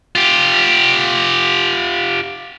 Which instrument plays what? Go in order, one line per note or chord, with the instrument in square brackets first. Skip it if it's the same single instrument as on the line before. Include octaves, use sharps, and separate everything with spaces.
[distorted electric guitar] F4 G4